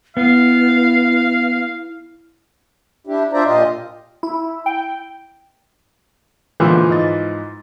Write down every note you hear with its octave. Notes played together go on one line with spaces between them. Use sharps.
B3 E4 F5
D4 E4 G4
D4 F4 C5 D5 E5 A#5
A#2 F4 G4 D#5
E4
G5
A#2 D3 E3 F3 G#3
G#2 D#5 A6